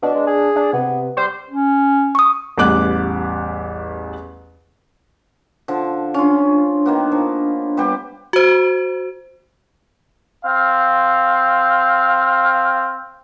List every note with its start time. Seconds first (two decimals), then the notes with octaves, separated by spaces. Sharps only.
0.02 B2 D4
0.14 G#3
0.27 G#4
0.56 D4
0.73 C3 B3
1.17 G3 C5
1.51 C#4
2.15 C#6 D#6
2.58 A1 E2 G3 D6 F#6
5.68 D3 F3
6.14 C#4 D4 F4
6.86 D#3 A#3 B3
7.12 F3
7.77 G3 B3 G4
8.33 F#4 C5
10.45 C4 F5